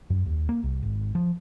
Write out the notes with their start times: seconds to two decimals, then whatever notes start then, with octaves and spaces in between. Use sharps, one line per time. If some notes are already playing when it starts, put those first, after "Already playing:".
0.10 F#2
0.26 D#2
0.49 A#3
0.63 C2
0.83 G#1
1.15 F3